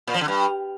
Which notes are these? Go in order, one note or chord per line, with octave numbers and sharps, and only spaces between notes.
A#2
F3
D3
G2